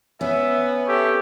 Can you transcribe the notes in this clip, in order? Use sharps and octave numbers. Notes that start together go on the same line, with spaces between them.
B3 C#4 E5
G4 A4 C#5 E5